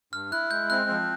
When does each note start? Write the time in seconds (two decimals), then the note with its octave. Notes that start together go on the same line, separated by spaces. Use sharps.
0.13 G2 F6
0.32 E4 F#6
0.51 G#3 G6
0.70 C4 F#6
0.90 F3